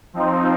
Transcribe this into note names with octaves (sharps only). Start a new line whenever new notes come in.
F3 C4 D#4